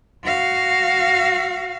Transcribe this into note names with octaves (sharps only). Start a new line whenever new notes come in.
F#4 F5